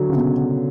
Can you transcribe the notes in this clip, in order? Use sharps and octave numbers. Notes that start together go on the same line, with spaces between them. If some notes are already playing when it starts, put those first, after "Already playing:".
Already playing: D3 F#3
C#3
B2